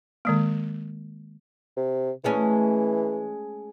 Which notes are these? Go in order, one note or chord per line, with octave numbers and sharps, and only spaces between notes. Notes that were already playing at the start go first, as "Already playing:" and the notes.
D#3 G#3 A#3
C3
E3 G#3 A3 C#4